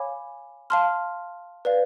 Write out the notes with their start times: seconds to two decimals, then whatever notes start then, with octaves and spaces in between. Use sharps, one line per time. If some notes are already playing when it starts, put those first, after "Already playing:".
Already playing: C#5 F5 G#5 B5 D6
0.70 F5 A5 C6 F6
1.65 B4 D5 F5